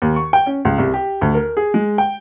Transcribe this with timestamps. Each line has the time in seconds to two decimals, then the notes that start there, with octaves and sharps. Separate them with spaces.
0.02 D#2
0.16 C#6
0.33 G5
0.46 C#4
0.65 C#2
0.78 C2
0.94 G4
1.21 D2
1.35 A#4
1.57 G#4
1.74 G#3
1.98 G5